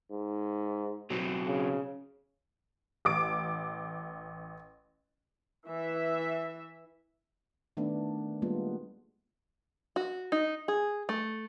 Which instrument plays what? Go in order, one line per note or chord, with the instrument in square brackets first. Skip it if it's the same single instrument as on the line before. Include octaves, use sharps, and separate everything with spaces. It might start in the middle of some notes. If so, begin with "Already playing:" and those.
[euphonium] G#2
[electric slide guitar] B2 F#3 C4
[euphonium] C#3
[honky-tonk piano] A1 D6 D7
[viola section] E3 E5
[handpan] D#3 A3 B3 D4
G3 G#3 A#3 B3 F4
[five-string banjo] F#4
D#4
G#4
A3